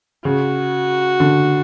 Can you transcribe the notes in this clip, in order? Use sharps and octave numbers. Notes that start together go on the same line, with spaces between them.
C#3 F#4
D3